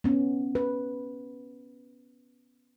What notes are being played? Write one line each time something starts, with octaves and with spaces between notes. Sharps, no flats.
B3 C#4
B4